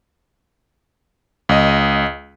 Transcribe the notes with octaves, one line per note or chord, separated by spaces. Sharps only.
C#2 D#5